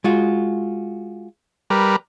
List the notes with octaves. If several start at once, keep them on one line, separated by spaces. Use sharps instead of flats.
G#3 F4 F#4
G3 A#4 B4